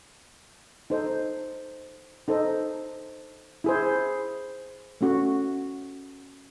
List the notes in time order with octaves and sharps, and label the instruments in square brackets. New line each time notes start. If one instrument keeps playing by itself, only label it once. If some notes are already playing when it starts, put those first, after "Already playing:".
[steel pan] D#4 A4 C5 D#5
D#4 A4 C5 D#5
E4 G#4 C5
A3 C#4 F#4